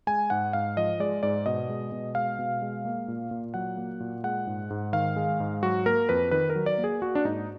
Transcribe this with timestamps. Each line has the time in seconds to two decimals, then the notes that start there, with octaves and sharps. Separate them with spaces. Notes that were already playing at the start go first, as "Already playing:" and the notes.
0.07 G#3 G#5
0.30 G#2 F#5
0.53 G#2 F5
0.77 F3 D#5
1.00 G#3 D5
1.23 G#2 D5
1.46 B2 D#5
1.69 G#3
1.92 B2
2.15 G#3 F5
2.39 B2
2.62 G#3
2.85 A#3
3.08 A#2
3.31 A#2
3.54 F#3 F#5
3.77 A#3
4.00 A#2
4.24 G#3 F#5
4.47 G#2
4.70 G#2
4.93 D#3 F5
5.16 G#3
5.40 G#2
5.63 F#3 F#4
5.86 A#3 A#4
6.09 F2 B4
6.31 D#3 B4
6.50 A#4
6.55 F#3
6.66 D5
6.78 A#3
6.84 G#4
7.02 A#3 F#4
7.15 D4
7.25 G#2 D#4